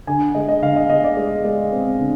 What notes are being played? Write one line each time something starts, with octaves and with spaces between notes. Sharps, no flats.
D3 G#5
G#3 D#5
D#5
D3 F5
D#5
G#3 D#5
D5
G#3
G#3
C4
D3